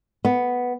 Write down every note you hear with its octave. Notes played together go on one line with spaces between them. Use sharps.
B3